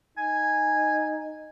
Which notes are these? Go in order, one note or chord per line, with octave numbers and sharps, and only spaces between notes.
D#4 G#5